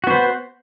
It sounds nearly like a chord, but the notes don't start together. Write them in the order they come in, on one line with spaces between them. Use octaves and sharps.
F#4 B3 C5